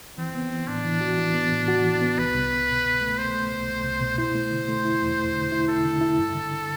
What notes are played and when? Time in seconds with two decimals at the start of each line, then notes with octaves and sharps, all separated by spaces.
0.18 E3 C4
0.35 B3
0.51 E3
0.67 A2 D4
0.85 E3
1.01 F#4
1.18 E3
1.34 B3
1.51 A2
1.68 F#4
1.84 E3
2.02 B3
2.18 C2 B4
2.35 C2
2.52 C2
2.69 B2
2.84 C2
3.01 A3
3.18 A3 C5
3.35 A3
3.52 C2
3.68 A3
3.84 C2
4.01 B2
4.18 E4 C5
4.35 A3
4.52 D3
4.68 A3
4.85 E4
5.02 E2
5.19 A3
5.34 D3
5.52 E4
5.68 E4 A4
5.85 D3
6.01 E4
6.18 G2
6.35 D3
6.51 D3